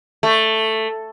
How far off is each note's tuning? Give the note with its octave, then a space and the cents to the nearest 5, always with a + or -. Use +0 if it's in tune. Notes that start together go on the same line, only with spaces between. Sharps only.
A3 +5